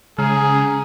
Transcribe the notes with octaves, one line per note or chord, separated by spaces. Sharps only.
C#3 G#3 G#4 A#5 F6